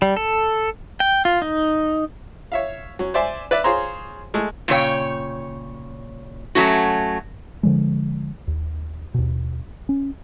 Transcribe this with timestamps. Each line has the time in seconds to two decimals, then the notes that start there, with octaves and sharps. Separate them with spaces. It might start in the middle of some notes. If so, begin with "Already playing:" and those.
0.02 G3
0.17 A4
1.00 G5
1.25 F4
1.42 D#4
2.52 C#5 E5 F5
2.99 F#3 C#4
3.14 C5 D5 E5 G#5 C6
3.51 B4 D5 E5
3.64 F4 G#4 C5 C#5 A#5 C6
4.34 G#3 A3
4.68 A#2 C#3 C#5 G5
6.55 F#3 A3 C#4 F#4
7.63 D3 F3 G#3
8.47 D#2
9.14 D#2 B2
9.89 C#4